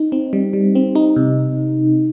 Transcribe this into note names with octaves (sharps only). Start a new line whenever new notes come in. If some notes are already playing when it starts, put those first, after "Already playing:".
Already playing: D#4
C4
G3
G3
C4
D#4
C3